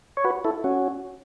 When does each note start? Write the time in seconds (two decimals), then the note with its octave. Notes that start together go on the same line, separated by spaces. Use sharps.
0.17 C#5
0.24 F#4 B4
0.45 E4 A4
0.64 C#4 F#4